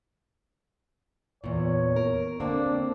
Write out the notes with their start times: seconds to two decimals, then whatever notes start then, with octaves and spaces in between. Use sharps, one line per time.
1.44 E2 A#2 C#5
1.96 A#4
2.40 D3 A#3 C4 D4